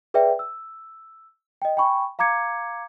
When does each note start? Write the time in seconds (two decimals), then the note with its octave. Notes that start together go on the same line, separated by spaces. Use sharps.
0.14 G#4 B4 D5 E5 G5
0.39 E6
1.62 D#5 G5
1.77 G5 G#5 B5 C#6
2.19 F5 A#5 D6 G#6 C#7